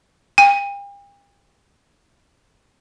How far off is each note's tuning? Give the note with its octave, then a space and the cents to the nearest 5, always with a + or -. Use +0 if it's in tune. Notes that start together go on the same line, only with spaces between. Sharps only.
G5 +40